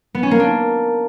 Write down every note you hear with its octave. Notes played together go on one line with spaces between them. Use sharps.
B3
C#4
A#3
D4